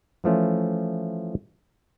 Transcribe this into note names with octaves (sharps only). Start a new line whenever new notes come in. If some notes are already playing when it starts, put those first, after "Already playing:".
E3 F3 A3 C#4 F4